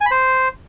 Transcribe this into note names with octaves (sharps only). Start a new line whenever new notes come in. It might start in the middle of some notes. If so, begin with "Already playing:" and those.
G#5
B5
C5